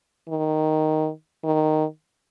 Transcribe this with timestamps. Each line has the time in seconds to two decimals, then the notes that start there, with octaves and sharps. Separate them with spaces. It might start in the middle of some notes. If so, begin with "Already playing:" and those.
0.29 D#3
1.44 D#3